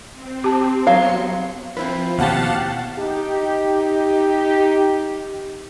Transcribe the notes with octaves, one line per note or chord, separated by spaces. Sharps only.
C4
G4 A5
F#3 B3 F5 C6 C#7
F3 C4 E4 B4
D#2 B2 G4 F5 F#5 A5
D#4 G4